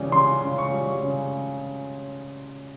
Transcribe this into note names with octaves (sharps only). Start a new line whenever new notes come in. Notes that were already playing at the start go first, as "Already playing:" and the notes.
Already playing: C#3 E3 G3
C#3 C6
C#3
C#6
G3
C#3